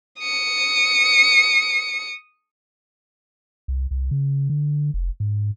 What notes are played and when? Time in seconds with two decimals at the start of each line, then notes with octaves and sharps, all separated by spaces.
0.19 D#6 C#7
3.68 C2
3.91 C2
4.11 C#3
4.50 D3
4.94 F1
5.20 G#2